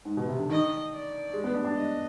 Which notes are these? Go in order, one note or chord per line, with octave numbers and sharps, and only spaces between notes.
G#2
B2
C3
D3
D#3 D#5
D5
G#3
B3
D4
D4
D#5